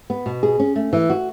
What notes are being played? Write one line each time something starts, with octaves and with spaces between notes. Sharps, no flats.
B3
B2
G#4
C#4
A3
E3
F#4